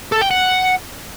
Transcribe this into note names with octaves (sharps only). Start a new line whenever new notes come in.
A4
G5
F#5